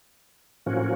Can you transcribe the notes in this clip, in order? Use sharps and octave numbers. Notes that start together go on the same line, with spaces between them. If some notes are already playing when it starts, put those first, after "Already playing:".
A2 F3 A#3 C#4 F#4